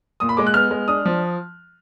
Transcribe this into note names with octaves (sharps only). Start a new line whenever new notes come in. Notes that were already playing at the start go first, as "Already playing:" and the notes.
A#2 D#6
B5
G#3 D6
F#6
B3 F6
G#3
D4 D#6
F3